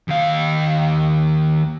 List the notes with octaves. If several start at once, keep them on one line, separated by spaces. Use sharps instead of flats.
D#2 F5